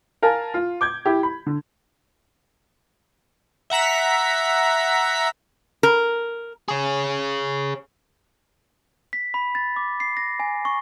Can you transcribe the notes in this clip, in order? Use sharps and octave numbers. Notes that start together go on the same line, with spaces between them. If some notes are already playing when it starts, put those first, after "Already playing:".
A#4 F5 G#5 A5
F4
D6 G6 G#6
E4 G4
B5
D3
E5 F#5 A#5 B6
A#4
G#4 C#5
B6
B5
A6
D6
C7
A#6
G#5
C#6